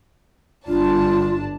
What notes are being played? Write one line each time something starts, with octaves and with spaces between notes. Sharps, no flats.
G1 D4 F4 A5